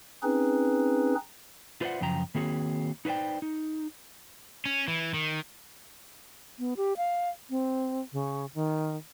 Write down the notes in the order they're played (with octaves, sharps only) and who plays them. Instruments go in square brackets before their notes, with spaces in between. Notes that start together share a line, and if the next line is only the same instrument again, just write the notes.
[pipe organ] C4 C#4 D#4 G#4 B4
[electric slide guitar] F4 B4 C5 D5 E5 F#5
F#2 C#3 F3 G5 A#5
D#3 A#3 C4 F#4 G#4 C#5
D#4 B4 C5 D5 G5
D#4
[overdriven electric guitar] C#4
E3
D#3
[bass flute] B3
G4
F5
C4
C#3
D#3